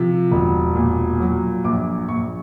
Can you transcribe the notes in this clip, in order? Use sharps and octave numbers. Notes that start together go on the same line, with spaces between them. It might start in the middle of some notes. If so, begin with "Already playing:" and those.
Already playing: C3 F3
E1
A#2
F#3
A#1 D6
A#1 C#6